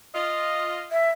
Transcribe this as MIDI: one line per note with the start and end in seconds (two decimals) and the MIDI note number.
0.15 0.88 65
0.15 0.88 75
0.91 1.10 76